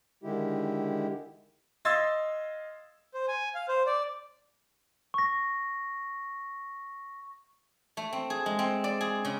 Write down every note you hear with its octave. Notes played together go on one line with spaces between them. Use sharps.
D3 D#3 G#3 E4 G4
D#5 F5 C6 E6 G#6 A6
C5
G#5
F5
C5
D5
C#6 A#6
A3
C4
G#4
G#3
C4
D5
G#4
C#3